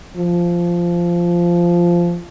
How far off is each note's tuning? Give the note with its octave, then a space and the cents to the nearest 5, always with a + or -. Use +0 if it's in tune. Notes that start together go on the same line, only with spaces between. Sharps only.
F3 -10